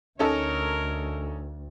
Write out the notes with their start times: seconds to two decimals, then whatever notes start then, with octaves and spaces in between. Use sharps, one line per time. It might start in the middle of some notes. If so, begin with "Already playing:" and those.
0.19 D2 C#4 D#4 A4 A#4 C#5